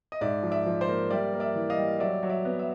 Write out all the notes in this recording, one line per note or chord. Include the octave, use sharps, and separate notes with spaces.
D#5
G#2 D5 E5
F3
D5 E5
F3
C5 D5
A#3
G3 D5 E5
A#3
D5 E5
E3
D#5 F5
G3
F#3 D5 E5
F#3
D5 E5
B3
E5